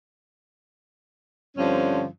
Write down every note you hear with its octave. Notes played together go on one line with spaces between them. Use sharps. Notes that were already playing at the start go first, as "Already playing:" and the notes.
G2 D3 F3 C4 C#4